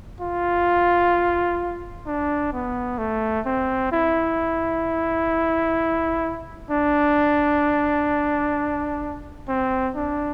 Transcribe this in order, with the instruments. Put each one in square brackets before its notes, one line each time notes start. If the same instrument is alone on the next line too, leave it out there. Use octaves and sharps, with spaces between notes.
[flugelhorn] F4
D4
B3
A3
C4
E4
D4
C4
D4